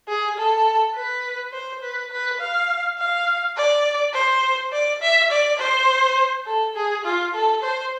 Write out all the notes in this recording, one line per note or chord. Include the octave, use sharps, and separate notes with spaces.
G#4
A4
B4
C5
B4
B4
F5
F5
D5
C5
D5
E5
D5
C5
A4
G#4
F4
A4
C5